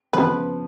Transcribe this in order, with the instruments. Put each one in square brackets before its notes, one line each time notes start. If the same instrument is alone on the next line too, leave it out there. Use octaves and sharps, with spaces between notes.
[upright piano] C#3 F3 B3 F4 [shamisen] B4